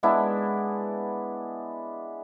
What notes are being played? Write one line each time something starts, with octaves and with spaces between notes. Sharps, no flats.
G#3 B3 D4 E4